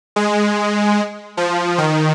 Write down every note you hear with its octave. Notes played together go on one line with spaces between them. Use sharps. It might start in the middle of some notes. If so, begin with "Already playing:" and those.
G#3
F3
D#3